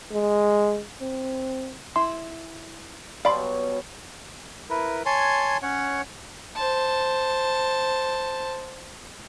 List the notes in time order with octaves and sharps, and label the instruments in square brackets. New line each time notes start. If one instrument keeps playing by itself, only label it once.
[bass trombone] G#3
C4
[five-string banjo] E4 [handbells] C6
[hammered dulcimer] B2 F#3 G3 [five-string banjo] D5 [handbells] F5 B5 C6
[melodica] E4 A#4 B4
C#5 G#5 A5 C6
C#4 C#5 F#5
[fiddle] C5 A5